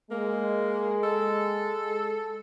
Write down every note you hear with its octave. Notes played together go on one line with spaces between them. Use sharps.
G#3 A#3
A4